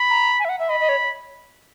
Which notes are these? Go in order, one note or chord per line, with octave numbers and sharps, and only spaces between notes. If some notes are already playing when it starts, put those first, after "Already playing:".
Already playing: B5
A#5
G#5
E5
F#5
E5
D#5 B5
D#5
C#5